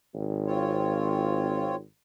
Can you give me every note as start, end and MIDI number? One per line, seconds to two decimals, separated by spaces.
0.14 1.83 32
0.47 1.75 60
0.47 1.75 65
0.47 1.75 73